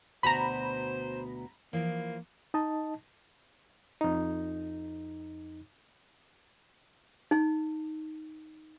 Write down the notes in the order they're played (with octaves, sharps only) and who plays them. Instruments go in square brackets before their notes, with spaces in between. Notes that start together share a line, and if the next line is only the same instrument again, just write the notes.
[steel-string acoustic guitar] D2 B2 B3 [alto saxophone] C5 [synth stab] A#5 B5
[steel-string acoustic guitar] E3 F3 [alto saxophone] A#3
[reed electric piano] D#4 D#5 A5
F2 D#4
[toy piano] D#4